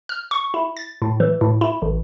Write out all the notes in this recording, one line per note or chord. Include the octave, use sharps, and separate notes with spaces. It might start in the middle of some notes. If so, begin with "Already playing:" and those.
F6
C#6
E4
A6
A2
E3
A2
E4
A1